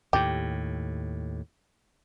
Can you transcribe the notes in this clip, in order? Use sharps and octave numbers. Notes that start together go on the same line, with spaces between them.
D#2 A2 G4